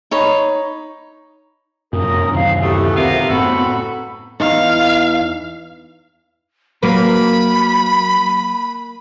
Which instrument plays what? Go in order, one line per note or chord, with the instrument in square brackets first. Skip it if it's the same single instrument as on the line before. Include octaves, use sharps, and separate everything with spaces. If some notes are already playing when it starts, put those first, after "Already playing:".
[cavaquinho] D#4 C#5 B5
[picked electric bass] F1 A#2 [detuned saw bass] F#2 [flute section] A#4 D#6
[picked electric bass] D1 C3 D#3 [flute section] F5
[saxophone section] B2 A3 [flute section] E4 G4 D#6
[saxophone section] A#2 B3 F5 [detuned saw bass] C4 [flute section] G4 A#4 E5
[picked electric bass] F#1 A2 B3 [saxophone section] F#3 F#4 A4 [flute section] F#5 B5
[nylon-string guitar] E2 D#4 [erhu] F5
[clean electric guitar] F#3 [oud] A#3 B4 [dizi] B5